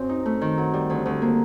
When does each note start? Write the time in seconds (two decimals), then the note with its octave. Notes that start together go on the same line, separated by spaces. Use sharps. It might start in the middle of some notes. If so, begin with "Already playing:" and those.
Already playing: F#2 C4
0.09 D#4
0.26 A3
0.41 D#3
0.58 F#3
0.74 G3
0.90 D2
1.06 D2
1.22 A#3